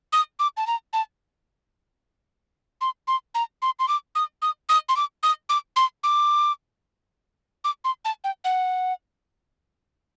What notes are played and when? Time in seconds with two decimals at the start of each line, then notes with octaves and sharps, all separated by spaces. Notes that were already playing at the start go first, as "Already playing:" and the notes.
0.13 D#6
0.39 D6
0.57 A5
0.67 A#5
0.93 A5
2.81 C6
3.08 C6
3.35 A#5
3.62 C6
3.79 C6
3.88 D6
4.15 D#6
4.42 D#6
4.69 D#6
4.89 C6
4.96 D6
5.23 D#6
5.49 D6
5.76 C6
6.03 D6
7.64 D6
7.84 C6
8.05 A5
8.24 G5
8.44 F#5